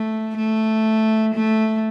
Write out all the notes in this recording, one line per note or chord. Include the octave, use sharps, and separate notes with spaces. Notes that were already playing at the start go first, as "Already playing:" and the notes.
Already playing: A3
A3
A3